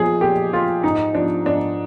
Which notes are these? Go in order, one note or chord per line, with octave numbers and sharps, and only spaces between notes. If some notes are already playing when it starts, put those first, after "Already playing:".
Already playing: A#2 F3 G#4
A#2 G4
F3 F4
G#2 D#4
F3 D4
G#2 D4